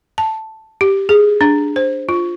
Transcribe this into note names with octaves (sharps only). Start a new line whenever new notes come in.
A5
G4
G#4
D4
C5
F4